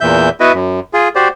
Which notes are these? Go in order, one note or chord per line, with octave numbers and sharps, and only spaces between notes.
E2 A#2 E3 E5 G6
B3 E4 F#4 B4 D#5
F#2
F4 G#4
F#4 G4 C5 D5